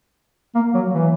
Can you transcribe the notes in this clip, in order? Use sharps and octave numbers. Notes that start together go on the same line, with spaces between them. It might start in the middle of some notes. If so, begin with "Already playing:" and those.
A#3
F#3
E3